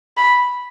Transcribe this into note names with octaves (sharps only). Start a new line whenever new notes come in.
B5